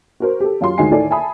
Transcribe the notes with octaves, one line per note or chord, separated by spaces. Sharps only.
F#4 A#4 C5
G4 A4
F#2 F4 G4 C6
D2 D#3 G#3 D#5 G#5 C7
A2 D#3 E4 A4 D5 G#5
E5 G#5 A5 B5 D#6